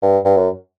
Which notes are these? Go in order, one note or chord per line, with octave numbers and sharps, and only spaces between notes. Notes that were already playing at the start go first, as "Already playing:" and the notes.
G2
G2
F#2